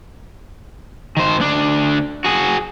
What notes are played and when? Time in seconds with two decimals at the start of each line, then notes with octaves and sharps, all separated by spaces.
1.17 D#3 C5
1.39 D2 D4
2.24 F#4 G#4